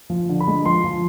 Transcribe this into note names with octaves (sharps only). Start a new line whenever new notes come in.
F3
D3
B5
G#3
F3 C6
F3